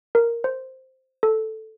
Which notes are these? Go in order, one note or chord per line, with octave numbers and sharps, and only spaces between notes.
A#4
C5
A4